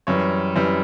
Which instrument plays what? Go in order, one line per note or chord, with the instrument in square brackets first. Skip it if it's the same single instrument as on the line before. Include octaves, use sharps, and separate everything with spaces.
[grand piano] F#2 E3 G3 C#5
F#2 E3 G3